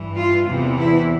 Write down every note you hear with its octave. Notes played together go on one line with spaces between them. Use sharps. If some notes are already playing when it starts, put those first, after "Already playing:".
Already playing: G2 E3
F4
E2 C3 E3
E4